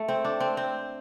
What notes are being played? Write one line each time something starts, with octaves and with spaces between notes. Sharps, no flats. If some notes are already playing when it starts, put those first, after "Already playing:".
Already playing: A3
C4
D4
C4
C4